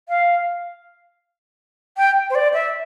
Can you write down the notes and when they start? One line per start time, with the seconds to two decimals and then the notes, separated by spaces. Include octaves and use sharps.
0.09 F5
1.97 G5
2.30 C5
2.35 D5
2.53 E5